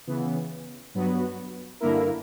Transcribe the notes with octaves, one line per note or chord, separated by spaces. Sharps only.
C#3 E3 B3
G2 F#3 B3 F#4 B4
G2 D3 A#3 E4 A#4